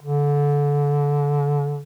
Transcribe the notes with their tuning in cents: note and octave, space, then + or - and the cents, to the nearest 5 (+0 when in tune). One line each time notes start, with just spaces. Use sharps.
D3 -25